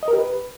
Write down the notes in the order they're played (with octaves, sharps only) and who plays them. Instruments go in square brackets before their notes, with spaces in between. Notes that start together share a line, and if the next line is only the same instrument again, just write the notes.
[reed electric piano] D#5
A#4
G4
B4